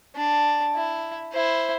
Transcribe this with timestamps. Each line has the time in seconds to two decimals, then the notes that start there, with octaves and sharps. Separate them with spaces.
0.15 D4
0.75 E4
1.32 E4 C5